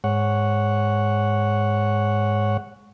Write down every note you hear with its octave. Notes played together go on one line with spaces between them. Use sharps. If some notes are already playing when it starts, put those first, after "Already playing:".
G#2 C#5 F#5